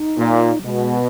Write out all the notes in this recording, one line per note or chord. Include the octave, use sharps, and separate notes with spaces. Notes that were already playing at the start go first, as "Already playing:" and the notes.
Already playing: D#4
A#2
F#3
B2 G#3